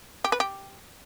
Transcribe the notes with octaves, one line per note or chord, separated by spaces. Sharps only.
G4
B4
G4